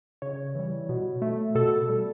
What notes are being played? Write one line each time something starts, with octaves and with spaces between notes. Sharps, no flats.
C#3 C#5
E3 G3
B2
A3
B2 A4
G3